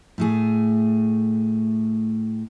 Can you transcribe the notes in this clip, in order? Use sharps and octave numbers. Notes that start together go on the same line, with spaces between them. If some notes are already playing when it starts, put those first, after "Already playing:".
A2 A3 G#4